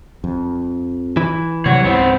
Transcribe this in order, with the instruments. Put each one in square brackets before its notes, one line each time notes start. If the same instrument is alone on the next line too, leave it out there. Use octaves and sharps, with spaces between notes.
[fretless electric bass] F2
[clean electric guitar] E3
[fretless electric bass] C3 F#3 G3 [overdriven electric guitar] C#5 F#5
[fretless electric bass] C#2 G#2 [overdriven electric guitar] B3 C4